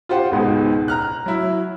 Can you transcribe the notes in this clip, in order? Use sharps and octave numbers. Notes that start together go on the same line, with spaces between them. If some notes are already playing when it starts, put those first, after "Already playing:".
F4 G4 C5 F#5
C#2 G#2 B2
A#5 F6 F#6
F#3 E4